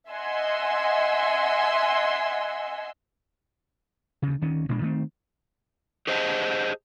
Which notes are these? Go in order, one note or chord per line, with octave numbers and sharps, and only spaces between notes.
D#5 E5 F#5 G#5 C6 E6
D2 C#3
D2 D#3 C#4
A1 A#2 G#3 D4
D#3 A3 C4
G4 G#4 C5 D#5 F#5 A5